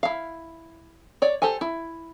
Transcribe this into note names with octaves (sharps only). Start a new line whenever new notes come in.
E4 F5
C#5 D5
G4 A4 C5 G#5
E4